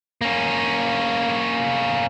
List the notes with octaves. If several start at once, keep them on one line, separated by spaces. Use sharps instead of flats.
A#3 C#4